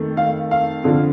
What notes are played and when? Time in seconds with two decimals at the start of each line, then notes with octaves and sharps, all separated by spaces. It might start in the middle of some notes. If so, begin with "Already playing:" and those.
Already playing: F2 D#3 A3
0.17 F5
0.51 F5
0.84 F2 D3 F3